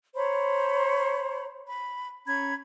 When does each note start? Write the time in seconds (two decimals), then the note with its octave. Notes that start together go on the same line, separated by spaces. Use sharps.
0.15 C5 C#5 A#5 B5
1.66 B5
2.26 C#4 A#5 B5 G#6